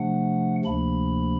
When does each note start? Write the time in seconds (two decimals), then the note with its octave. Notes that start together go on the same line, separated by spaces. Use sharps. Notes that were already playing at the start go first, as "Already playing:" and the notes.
Already playing: C3 F3 A3 D4 F#5
0.65 D2 C3 F3 A#3 D4 B5